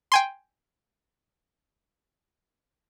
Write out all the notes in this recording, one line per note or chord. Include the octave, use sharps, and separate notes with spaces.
G5 G#5 C6